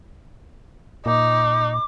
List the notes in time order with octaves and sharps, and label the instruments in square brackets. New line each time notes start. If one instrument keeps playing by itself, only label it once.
[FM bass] A#2 [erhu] D#4 [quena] D6